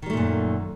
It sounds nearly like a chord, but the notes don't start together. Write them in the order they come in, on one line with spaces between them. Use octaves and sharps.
D#3 G3 A3 A#2 F#2